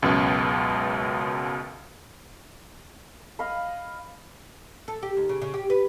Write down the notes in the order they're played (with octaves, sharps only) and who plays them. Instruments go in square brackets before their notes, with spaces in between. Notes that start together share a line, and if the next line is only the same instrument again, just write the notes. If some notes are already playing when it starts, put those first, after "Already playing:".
[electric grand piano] C#2 F#2 B2
[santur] D#5 F5 B5
[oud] A4
G4
D#2
C#3
C#3
G4
B4